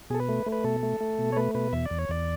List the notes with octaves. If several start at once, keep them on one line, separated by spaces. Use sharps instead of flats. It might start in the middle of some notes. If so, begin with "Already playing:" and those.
B2 G#4 A4
B4
A3
A3
B4
B2 A4
A3
A3
B2
C#5
A3 B4
B2 B4
E2 E5
D5
E2
C#5
E2 D5